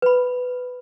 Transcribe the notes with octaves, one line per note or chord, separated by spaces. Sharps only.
B4 B5